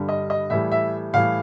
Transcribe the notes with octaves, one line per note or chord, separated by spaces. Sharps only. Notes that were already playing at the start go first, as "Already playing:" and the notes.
Already playing: G2 D3 G3
D#5
D#5
A2 E3 G3 E5
E5
A2 E3 G3 F5